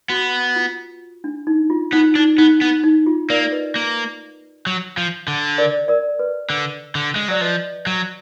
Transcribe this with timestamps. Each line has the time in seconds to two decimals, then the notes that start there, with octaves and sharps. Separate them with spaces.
0.09 B3 F#4
0.56 F4
1.24 D4
1.47 D#4
1.70 F4
1.92 B3 D#4
2.15 D4 D#4
2.38 B3 D#4
2.61 B3 D#4
2.83 D#4
3.06 F4
3.30 A#3 A#4 D5
3.52 B4 D#5
3.76 A#3
4.67 F#3
4.97 F3
5.28 D3
5.58 A#4 D5
5.88 A#4 D5
6.19 B4
6.50 D3
6.95 D3
7.16 G#3
7.28 F#3 D5
7.41 F3 B4 D#5
7.87 F#3